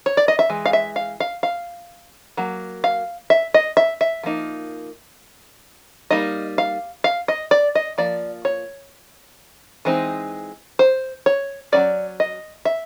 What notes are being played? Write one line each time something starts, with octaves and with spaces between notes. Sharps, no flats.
C#5
D5
D#5
E5
E3 G#3
F5
E5
F5
F5
F5
F#3 A#3
F5
E5
D#5
E5
E5
F3 A#3 D#4
G3 A#3 D#4 D#5
F5
F5
D#5
D5
D#5
F3 A#3 D5
C#5
E3 G#3 C4 D#4
C5
C#5
F#3 A#3 C#4 D5
D#5
E5